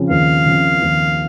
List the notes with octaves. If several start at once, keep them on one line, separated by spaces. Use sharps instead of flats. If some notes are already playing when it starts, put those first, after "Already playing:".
Already playing: C#3 F3 C4
D#2 F5
C#3 F3 C4
D#2